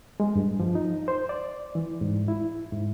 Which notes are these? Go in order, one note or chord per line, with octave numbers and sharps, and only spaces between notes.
G#3
G2
F3
D#4
C5
D5
E3
G#2
E4
G#2